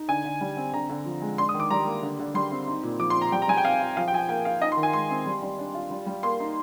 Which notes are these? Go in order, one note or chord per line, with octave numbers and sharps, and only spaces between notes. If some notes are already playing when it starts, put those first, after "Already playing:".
Already playing: D#4
D3 G#5
D3
G3
C4
D3 A#5
D3
F3
G#3
D4 C6
D#6
D#3
D6
G3 A#5
A#3
D3
D3
G3 C6
C4
D#4
A#2
F3 D6
C6
C4
A#5
G3 G5
A#5
G3 G#5
G5
C4 F5
F4
F3 F5
G5
F3 G#5
G5
A#3 G5
F4 F5
D#4 D#5
C6
D#3
G#5
G#3 C6
C4
G3
G3
D4
F4
G3
G3
A#3 C6
D#4